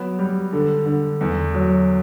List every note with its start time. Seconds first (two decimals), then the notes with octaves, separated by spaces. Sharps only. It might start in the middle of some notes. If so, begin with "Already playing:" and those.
Already playing: F#3 B3
0.19 G3
0.53 D3
0.86 D3
1.21 E2
1.54 F#3